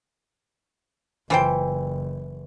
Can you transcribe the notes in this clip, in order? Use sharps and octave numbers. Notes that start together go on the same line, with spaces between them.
F#1 E3 F4 C5 G5